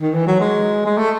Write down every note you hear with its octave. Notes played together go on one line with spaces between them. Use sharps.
D#3
E3
F#3
G#3
G#3
A3